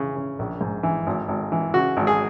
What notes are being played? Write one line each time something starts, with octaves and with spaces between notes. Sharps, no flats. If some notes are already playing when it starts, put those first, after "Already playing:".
Already playing: C#3 E3
C#3
A#1
G#2
E3
G#1
G#1
E3
C#3 F#4
G#1
G#4